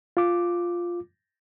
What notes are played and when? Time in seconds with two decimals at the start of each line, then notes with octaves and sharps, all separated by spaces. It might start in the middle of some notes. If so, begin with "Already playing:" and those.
0.17 F4 D6